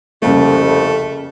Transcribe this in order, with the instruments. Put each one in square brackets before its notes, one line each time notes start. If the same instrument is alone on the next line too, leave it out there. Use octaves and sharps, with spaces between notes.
[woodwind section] C2 F2 [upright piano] C#3 G3 A#3 [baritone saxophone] A3